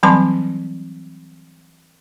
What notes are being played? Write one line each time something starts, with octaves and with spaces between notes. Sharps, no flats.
E3 F#3 G3 C4 A5 C6